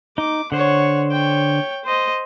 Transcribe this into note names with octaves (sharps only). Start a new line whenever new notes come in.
D#4 D6
D3 C5 C#5 F#5
C#5 G5
C5 D#5